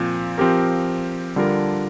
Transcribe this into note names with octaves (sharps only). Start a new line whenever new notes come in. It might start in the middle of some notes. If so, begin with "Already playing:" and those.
Already playing: A#2 F3 C4
F3 C4 G4 A#4
D3 G3 D4 F4 A#4